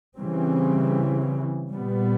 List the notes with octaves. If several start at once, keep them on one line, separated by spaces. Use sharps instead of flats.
C#3 E3 G3 C4
A#2 G3 B3